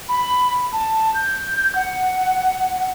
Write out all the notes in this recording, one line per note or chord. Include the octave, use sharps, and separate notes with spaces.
B5
A5
G6
F#5